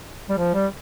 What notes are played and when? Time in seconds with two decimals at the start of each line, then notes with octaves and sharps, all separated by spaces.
0.30 G3
0.38 F3
0.54 G3